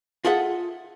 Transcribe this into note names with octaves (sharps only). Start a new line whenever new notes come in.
F4 G#4 A4 E5 F#5